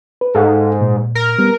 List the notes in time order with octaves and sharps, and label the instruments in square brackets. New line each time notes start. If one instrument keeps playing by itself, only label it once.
[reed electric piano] B4
[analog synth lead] G#2 [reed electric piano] A4 F5 F#5
[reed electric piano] A#2
[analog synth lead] A#4
[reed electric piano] G3 B3